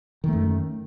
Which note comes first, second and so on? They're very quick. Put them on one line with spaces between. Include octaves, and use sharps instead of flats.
D#3 A3 F#2